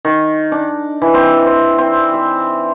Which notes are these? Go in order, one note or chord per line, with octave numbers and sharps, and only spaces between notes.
D#3
D4
E3
C4
C5
C4
E5